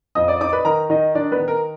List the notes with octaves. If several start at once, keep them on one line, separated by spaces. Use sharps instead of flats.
F2 D#5 D#6
D5 D6
D#4 D5 D6
B4 B5
D#3 A#4 A#5
D#3 D#4 D#5
D#3 D4 D5
B3 B4
D#3
A#4